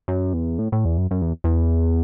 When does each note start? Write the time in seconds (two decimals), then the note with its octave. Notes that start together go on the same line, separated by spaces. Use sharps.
0.08 F#2
0.34 E2
0.59 A2
0.72 A2
0.85 E2
0.98 F#2
1.11 F#2
1.22 E2
1.44 E2